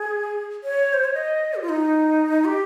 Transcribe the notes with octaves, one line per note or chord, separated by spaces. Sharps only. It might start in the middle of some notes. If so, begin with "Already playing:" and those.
Already playing: G#4
C#5
C5
C#5
D#5
G4
F4
D#4
G4